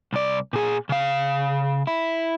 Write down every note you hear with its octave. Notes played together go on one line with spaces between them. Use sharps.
C2 D5
A#2 G#4
C#3 F5
E4